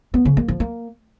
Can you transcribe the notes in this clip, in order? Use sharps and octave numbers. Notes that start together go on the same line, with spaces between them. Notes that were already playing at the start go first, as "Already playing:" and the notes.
B3
C#3
A#3
F3
A#3